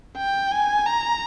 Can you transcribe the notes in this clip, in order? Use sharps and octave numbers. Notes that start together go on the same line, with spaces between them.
G5
G#5
A#5